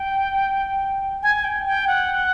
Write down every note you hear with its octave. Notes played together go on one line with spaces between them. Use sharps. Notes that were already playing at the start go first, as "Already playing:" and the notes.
Already playing: G5
G#5
G5
G5
F#5